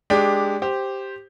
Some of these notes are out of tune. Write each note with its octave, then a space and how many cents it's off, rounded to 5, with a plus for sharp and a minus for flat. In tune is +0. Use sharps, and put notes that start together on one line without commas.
G#3 +0 D4 +0 G4 +10
G4 +0 C5 +0